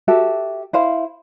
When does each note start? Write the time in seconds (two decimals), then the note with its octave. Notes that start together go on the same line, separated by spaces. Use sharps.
0.08 F#4 G4 A4 E5
0.73 E4 C5 F5